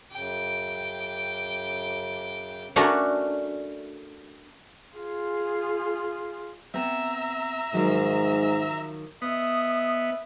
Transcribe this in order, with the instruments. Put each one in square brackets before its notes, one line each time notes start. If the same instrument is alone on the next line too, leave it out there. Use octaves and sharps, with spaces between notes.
[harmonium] F#2 C#3 [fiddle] G5 D6
[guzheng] A3 C#4 D4 F#4 A#4
[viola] F4 G#4
[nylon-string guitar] B3 C4 [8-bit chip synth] E5 A#5 E6
[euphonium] G#2 [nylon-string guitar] D#3 F3 F#3
[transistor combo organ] B3 [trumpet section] D#5 E5 [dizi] D#6